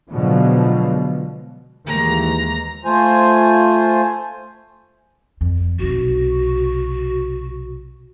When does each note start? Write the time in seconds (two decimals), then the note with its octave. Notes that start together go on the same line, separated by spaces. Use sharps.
0.10 B2 D3 F3 F#3 G#3
1.86 D#2 E3 G#3 A#5
2.23 A#5
2.85 A3 F4 C5 G#5
5.41 F2
5.79 B1 C3 F#4